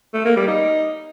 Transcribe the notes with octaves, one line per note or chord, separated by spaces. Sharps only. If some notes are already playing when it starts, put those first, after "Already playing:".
A3
A#3
G3
D#4